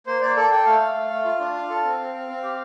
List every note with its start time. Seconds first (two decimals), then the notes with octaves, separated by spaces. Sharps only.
0.07 A#3 C5
0.22 A#3 D5
0.36 A4 D5
0.51 A4 G5
0.66 A3 F5
0.81 A3
0.95 A3
1.10 A3
1.25 F4
1.40 D4
1.55 F4
1.70 A4
1.85 C4
2.00 C4
2.14 C4
2.29 C4
2.43 G4